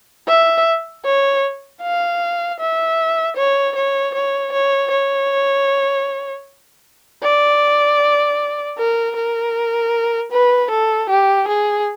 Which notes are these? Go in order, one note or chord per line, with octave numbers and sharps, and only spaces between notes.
E5
C#5
F5
E5
C#5
C#5
C#5
C#5
C#5
D5
A#4
A#4
B4
A4
G4
G#4